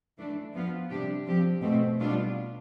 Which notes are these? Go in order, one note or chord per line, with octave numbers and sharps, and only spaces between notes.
E3 A3 D4
F3 B3 F4
C3 G3 D4 G4
F3 C4 G4
B2 A3 C4
B2 G3 D4 F4